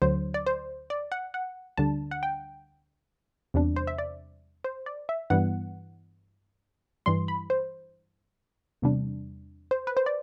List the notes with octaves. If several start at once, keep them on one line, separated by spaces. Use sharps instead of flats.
D2 D3 F#3 C5
D5
C5
D5
F#5
F#5
D2 D3 G3 D4 A5
F#5
G5
E2 C3 G3 D4
C5
E5
D5
C5
D5
E5
G2 E3 G3 B3 F#5
G2 E3 G3 C6
B5
C5
E2 C3 G3 D4
C5
B4
C5
D5